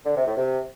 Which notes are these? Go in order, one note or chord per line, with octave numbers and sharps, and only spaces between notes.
D3
C3
A2
C3